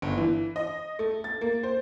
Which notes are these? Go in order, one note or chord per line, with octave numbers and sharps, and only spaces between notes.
G1
E3
D#5
A3
A6
A#3
C5